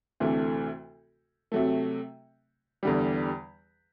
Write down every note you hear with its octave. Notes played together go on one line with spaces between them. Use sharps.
D2 C3 E3 A3
C3 F#3 A3
E2 D3 G3